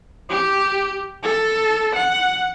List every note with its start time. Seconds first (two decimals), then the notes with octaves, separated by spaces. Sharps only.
0.29 G4
1.23 A4
1.95 F#5